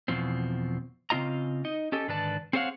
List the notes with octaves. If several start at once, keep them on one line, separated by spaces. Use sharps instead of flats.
E2 B2 F3 C4
C#3 C4 F4 D#5 A#5
D#4 D#5
C#4 G4 A4 D#5
G#2 D3 D#3 B4 D5 A5
C4 G#4 C5 C#5 F5 F#5